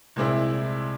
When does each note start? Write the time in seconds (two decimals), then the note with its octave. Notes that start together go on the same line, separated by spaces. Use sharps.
0.16 C2 A#2 G#3 C4 E4